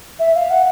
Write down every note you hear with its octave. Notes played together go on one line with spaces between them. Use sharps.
E5
F5
F#5